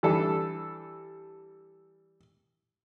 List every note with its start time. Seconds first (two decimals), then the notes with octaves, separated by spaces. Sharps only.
0.03 E3 G3 D4 A4